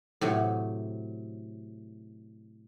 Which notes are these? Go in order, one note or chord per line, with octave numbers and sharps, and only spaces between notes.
A2 C3 F#3